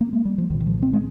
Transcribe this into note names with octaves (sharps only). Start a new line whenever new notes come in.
A#3
G#3
G3
F3
C2 A#2 D#3
D#3
F3
C4
G#3